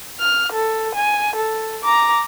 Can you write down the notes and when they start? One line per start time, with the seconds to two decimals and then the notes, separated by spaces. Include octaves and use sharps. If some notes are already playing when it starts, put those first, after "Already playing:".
0.20 F6
0.53 A4
0.96 G#5
1.36 A4
1.84 A#5 D6